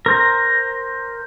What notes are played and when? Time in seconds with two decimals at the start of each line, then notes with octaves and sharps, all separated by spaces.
0.06 A#4 C5 A#5